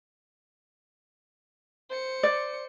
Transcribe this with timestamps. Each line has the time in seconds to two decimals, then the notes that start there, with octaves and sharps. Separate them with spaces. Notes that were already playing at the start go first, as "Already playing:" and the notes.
1.89 C5 C#7
2.23 D5